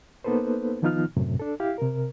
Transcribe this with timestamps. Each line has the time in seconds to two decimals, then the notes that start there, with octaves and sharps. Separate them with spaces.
0.24 A#3 B3 D#4 A4 B4 C5
0.82 D#3 F3 B3 D#4 F4 F6
1.17 F#2 A2 C3
1.40 D4 A4
1.60 E4 G4 F5
1.78 C3 A#4